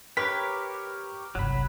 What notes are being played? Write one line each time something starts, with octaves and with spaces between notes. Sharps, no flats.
G4 A#4 B4 C#5 B6
G1 C2 F#3 B5